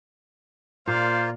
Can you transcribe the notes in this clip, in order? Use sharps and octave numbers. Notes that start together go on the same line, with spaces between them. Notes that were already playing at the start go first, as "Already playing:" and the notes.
A#2 A#3 F4 C5 D5 F5